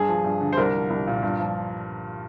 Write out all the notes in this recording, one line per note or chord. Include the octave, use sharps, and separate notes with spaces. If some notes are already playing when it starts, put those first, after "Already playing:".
Already playing: G2 G#4
F3
G2
D3
C5
C2 A#4
F3
C2
A#2
G2
F3